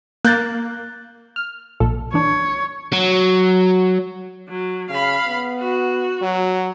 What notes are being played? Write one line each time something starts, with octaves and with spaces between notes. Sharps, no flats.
A#3 F#6 G6 A6
F6
A#1 A#2 A4
E3 D4 C#5
F#3
F#3
C#3 F5 B5
B3
F#4
F#3